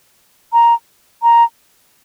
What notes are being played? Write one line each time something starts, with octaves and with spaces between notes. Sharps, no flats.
A#5
A#5